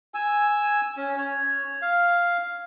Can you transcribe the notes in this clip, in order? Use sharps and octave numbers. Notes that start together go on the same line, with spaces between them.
G#5 E6
C#4
C#5
F5